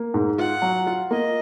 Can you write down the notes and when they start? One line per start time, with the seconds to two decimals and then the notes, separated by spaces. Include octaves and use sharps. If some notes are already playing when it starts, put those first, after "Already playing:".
Already playing: A#3
0.14 G#2
0.39 F4 F#5
0.62 F#3
0.87 F4
1.11 A#3 D#5